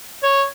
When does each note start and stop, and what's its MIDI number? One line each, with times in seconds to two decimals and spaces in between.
0.23 0.44 73